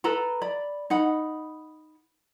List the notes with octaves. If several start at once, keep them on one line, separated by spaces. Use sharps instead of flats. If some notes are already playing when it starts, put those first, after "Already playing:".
A4 B4 A#5 B5
D5 B5
D#4 F#5 B5